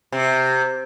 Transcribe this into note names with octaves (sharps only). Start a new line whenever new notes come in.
C3